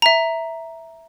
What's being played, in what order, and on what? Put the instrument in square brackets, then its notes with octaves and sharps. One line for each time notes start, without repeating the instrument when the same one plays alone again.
[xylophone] E5 A#5